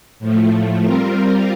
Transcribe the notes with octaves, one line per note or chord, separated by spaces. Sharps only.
A2 F3 A3
G3 C4 F4 A#4